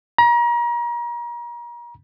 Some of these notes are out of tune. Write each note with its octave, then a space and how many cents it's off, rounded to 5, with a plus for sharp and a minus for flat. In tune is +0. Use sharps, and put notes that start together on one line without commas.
A#5 +35